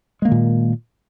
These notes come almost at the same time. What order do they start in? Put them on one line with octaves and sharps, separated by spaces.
G#3 A#3 D#3 A#2